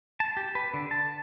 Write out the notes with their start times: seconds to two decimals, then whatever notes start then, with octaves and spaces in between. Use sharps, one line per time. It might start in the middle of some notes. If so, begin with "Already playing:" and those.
0.20 A5
0.37 G4
0.55 B4
0.74 D3
0.91 A5